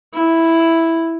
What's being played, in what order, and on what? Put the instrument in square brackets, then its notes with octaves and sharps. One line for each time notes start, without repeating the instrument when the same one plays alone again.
[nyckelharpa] E4